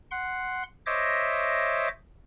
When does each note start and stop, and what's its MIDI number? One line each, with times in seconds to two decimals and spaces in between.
0.11 0.63 78
0.11 0.63 84
0.86 1.88 72
0.86 1.88 73
0.86 1.88 75
0.86 1.88 76
0.86 1.88 86
0.86 1.88 94